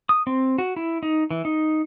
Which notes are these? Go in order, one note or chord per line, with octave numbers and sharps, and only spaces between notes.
D#6
C4
F#4
E4
D#4
E3
D#4